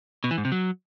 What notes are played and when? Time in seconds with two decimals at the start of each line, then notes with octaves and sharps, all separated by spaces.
0.24 B2
0.31 E3
0.38 G#2
0.45 C3
0.52 F#3